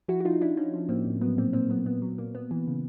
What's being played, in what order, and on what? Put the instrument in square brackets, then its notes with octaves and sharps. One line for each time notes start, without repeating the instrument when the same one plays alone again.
[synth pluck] F3 E4 F#4
F#4
F3 D#4 F4
F3 D4 E4
F3 C#4 D#4
F3
A2 A#3 C4
A2
F#3 B3
A#2 A#3 C4
A#2 A#3 C4
F#3 B3
A#2 B3
F#3
A#2 A#3
A#2 B3
E3
C#3